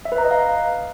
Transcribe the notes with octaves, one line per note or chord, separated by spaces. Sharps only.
E5
B4
A#5
D#5
F5